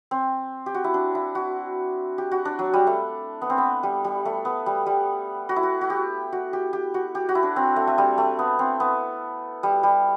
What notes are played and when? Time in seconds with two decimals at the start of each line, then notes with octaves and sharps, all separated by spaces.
0.11 C4
0.66 G4
0.74 F#4
0.84 E4
0.94 D4
1.15 E4
1.35 F#4
2.18 G4
2.31 F#4
2.45 D4
2.59 F#3
2.74 G3
2.87 A3
3.42 B3
3.50 C4
3.58 B3
3.83 G3
4.04 G3
4.25 A3
4.45 B3
4.66 G3
4.86 G3
5.49 F#4
5.56 E4
5.63 F#4
5.81 F#4
5.90 G4
6.32 F#4
6.53 G4
6.73 G4
6.94 F#4
7.15 G4
7.29 F#4
7.35 E4
7.43 D4
7.56 C4
7.76 A3
7.87 A3
7.98 G3
8.18 A3
8.39 B3
8.59 C4
8.80 B3
9.63 G3
9.83 G3